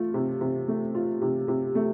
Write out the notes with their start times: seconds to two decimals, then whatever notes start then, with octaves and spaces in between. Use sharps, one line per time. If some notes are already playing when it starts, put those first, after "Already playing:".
Already playing: A3 F4
0.14 C3
0.41 C3
0.68 A3
0.95 F4
1.22 C3
1.48 C3
1.75 A3